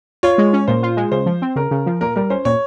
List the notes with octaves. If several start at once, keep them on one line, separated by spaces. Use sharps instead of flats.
F4 C#5
G#3
C#4
A#2 C5
F4
G#3
C#3 C5
F3
C4
C#3 A#4
C#3
F3
A#2 A#4
G3 A#4
C#4 C5
A#2 C#5